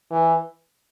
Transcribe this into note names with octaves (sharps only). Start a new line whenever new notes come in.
E3